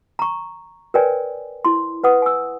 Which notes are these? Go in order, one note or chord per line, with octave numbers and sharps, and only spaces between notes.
A#5 C#6
A#4 B4 C#5 D5 G5 G#5
E4 C6
B4 F#5 D#6
G#5 E6